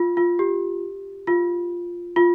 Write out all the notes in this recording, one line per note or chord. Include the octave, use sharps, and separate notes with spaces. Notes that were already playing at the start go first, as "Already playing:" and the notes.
Already playing: F4
F4
G4
F4
F4